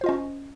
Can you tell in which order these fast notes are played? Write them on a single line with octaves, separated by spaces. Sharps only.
C5 F4 D#5 C#4